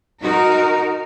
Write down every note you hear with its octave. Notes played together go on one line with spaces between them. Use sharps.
D#4 F#4 A#4